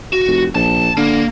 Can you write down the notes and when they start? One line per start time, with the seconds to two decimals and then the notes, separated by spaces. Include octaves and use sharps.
0.13 F#4
0.27 F1
0.55 A#1 A5
0.97 D3 A#3